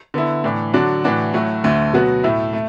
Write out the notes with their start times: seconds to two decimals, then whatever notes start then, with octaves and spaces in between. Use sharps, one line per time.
0.14 D3 B3 E4
0.44 A2 E3 D4
0.74 D3 F#3 D4 F#4
1.04 A2 E3 D4 F#4
1.34 A2 F#3 A3 F#4
1.64 D2 D3 A3
1.93 B2 F#3 B3 F#4
2.23 A2 A3 E4
2.53 A3